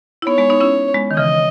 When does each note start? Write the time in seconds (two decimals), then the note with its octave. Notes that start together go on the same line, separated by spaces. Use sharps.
0.22 E4
0.27 B3 D#4 C#5
0.38 G#3 B3
0.50 B3 D#4
0.60 C#4 E4
0.94 G#3 B3
1.11 D#3
1.16 C#3 E3 D#5